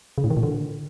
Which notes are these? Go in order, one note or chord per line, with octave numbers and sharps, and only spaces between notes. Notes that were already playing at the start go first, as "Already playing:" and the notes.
C#3
A2
D#3
A#2
D3